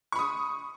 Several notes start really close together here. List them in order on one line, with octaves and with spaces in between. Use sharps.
C#6 B5 D#6